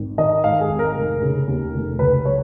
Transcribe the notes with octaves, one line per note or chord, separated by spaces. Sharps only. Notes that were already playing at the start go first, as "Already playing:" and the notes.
Already playing: G#1
D#3 D#5
G#2 F5
G#4
G#1
A#4
F1
C#3
D#2
F1
C#2 B4
F#3 C#5